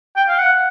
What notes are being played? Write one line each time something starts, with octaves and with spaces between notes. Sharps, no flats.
G5
F5
F#5